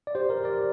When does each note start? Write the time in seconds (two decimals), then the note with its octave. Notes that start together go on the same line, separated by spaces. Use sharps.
0.07 D5
0.15 G4 C5
0.29 A#4 D5
0.44 A#4 D5